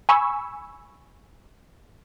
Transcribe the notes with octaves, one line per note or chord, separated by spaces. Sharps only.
G#5 B5 C#6 E6